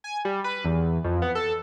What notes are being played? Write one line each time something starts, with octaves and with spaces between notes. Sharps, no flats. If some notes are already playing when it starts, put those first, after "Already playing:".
G#5
G3
B4
E2
F2
B3
A4